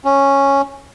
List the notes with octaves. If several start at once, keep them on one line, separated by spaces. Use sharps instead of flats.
C#4